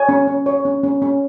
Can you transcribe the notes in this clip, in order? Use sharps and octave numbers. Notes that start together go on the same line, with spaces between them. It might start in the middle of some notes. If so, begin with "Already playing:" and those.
Already playing: C#5 G#5
C#4
C#4
C#5
C#4
C#4
C#4